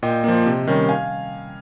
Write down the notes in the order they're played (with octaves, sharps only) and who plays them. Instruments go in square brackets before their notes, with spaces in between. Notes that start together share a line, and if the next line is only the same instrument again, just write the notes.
[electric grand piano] A#2 D#5 G5
F3 A#3
C3
D#3 G3 C#4
F5 G#5